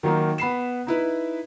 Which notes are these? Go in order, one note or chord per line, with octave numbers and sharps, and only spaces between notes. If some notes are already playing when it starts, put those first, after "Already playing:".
D#3 F#3 A#3 D#4
B3 B5 C7 E7
D#4 E4 B4